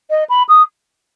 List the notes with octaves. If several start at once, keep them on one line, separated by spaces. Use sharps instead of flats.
D#5
B5
D#6